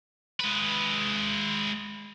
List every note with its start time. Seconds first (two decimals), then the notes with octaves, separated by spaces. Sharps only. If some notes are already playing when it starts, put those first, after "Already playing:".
0.40 G#3 B4